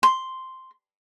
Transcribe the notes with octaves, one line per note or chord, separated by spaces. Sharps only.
C6